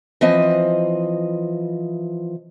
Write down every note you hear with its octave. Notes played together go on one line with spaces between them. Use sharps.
E3 F3 C4 D#5